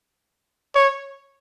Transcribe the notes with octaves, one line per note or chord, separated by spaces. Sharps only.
C#5